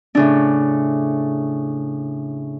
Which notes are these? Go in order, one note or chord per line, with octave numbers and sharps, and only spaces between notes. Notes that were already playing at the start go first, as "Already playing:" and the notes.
A2 C#3 D4